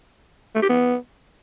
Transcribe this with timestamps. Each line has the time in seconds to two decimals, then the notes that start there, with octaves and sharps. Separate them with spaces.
0.55 A3
0.62 G4
0.69 B3